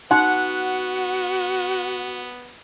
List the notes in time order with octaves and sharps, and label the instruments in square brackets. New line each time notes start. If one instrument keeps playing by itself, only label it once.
[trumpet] B3 [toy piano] D#4 C6 [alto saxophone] F#4 [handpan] F#5